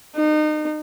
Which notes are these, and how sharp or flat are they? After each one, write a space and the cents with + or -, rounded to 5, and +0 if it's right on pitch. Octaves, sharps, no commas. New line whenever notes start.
D#4 -30